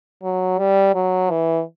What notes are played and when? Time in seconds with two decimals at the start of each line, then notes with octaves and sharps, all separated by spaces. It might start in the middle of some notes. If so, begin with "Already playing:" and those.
0.23 F#3
0.59 G3
0.95 F#3
1.30 E3